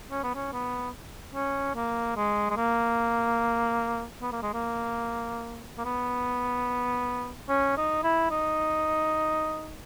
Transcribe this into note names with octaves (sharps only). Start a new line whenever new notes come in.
C#4
B3
C#4
B3
C#4
A#3
G#3
G#3
A#3
B3
A#3
G#3
A#3
A#3
B3
C#4
D#4
E4
D#4